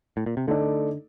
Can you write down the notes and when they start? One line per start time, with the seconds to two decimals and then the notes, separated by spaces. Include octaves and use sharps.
0.17 A2
0.26 A#2
0.37 C3
0.47 D3 A3 D#4 A4 D5